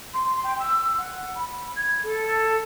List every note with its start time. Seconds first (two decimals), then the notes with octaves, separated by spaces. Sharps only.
0.14 C6
0.43 G5
0.60 E6
0.98 F#5
1.35 B5
1.76 G#6
2.03 A4